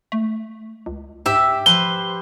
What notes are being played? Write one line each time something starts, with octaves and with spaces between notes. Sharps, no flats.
A3
C#2
G#2 G4 E5
F3 B4 C5 G7